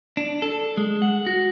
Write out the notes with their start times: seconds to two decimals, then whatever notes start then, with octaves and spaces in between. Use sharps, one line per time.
0.17 D4
0.42 A4
0.77 G#3
1.02 F#5
1.26 F#4